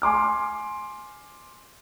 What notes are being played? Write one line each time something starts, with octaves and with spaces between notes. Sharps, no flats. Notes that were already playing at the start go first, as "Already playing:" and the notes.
G#5 C6 D6 F6